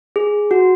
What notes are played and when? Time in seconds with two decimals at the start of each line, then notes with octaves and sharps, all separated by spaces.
0.16 G#4
0.51 F#4